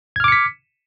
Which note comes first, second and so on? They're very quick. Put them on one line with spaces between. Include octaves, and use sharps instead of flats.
G#6 F6 D6 C#7 B6